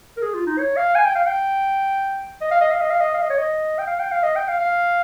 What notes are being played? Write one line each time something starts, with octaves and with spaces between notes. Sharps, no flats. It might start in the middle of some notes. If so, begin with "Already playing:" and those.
A#4
G#4
F4
D#4
C#5
F5
G#5
G5
F5
G5
D#5
F5
D#5
F5
D#5
F5
D#5
F5
D#5
C#5
D#5
G5
F5
G5
F5
D#5
G5
F5
F5